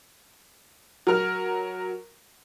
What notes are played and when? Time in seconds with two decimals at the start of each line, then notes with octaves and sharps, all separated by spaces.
1.07 F#3 A#4 F6